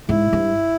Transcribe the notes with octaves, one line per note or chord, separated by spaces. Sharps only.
G#2 E4
G2